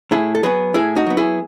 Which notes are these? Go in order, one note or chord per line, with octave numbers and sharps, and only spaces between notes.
A2 E4 G#4
A4
F#3 B3 G#4 B4
A2 E4 G#4
D#4 F#4
F#3 B3
E4 G#4